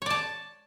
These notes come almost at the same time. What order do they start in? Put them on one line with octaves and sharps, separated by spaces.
C#5 D5 A5